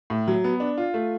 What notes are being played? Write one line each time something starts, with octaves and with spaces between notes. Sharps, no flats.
A2
F#3
B3
D4
F4
A3